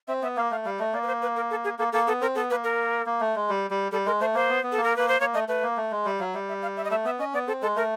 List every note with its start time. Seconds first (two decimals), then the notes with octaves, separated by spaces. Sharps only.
0.08 C4 E5
0.22 B3 E5
0.36 A#3 F5
0.51 A3 F5
0.65 G3 F5
0.79 A3 D#5
0.93 A#3 D5
1.03 B4
1.07 C5
1.22 B4
1.36 A#4
1.50 A4
1.64 G#4
1.79 A#3 A4
1.92 A#3 A4
2.07 B3 A4
2.21 C4 A#4
2.35 B3 A4
2.50 A#3 B4
2.64 A#4
3.06 A#3
3.20 A3
3.36 G#3
3.49 G3
3.71 G3
3.92 G3 A4
4.06 G#3 A#4
4.20 A3 C5
4.34 A#3 C5
4.49 B3
4.63 B3
4.72 A4
4.77 A#3
4.84 A#4
4.96 A#3 B4
5.08 C5
5.20 A#3 C#5
5.34 A3 D#5
5.48 A3 B4
5.63 A#3
5.77 A3
5.92 G#3
6.05 G3 E5
6.19 F#3 F5
6.34 G3 E5
6.48 E5
6.62 F5
6.77 E5
6.85 D#5
6.90 A3 E5
7.05 B3 E5
7.19 C#4 D#5
7.34 B3 D5
7.47 C4 A4
7.62 G#3 A4
7.76 A3 A#4